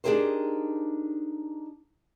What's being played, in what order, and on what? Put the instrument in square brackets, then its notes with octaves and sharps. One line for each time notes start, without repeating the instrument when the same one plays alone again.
[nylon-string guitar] D4 D#4 G4 G#4 A#4 C5